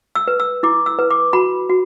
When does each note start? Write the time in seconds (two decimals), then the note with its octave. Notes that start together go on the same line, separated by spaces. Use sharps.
0.15 E6
0.28 B4
0.40 E6
0.63 E4 D6
0.86 E6
0.99 B4
1.10 D6
1.33 F#4 B5
1.69 F#4